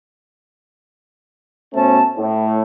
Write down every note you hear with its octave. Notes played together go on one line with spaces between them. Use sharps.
B2 A3 C#4 C5 A5
A2